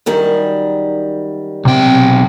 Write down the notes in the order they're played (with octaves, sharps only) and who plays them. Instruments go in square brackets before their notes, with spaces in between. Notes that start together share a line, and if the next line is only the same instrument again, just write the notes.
[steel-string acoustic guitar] F#2 D#3 G3
[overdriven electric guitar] B1 G5 [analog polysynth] C3